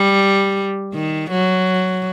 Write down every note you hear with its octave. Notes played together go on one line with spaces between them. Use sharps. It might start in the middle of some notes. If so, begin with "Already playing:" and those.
Already playing: G3
D#3
F#3